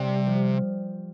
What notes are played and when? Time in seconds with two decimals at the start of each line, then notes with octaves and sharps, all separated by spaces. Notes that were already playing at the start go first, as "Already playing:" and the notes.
Already playing: C3 G3
0.27 F3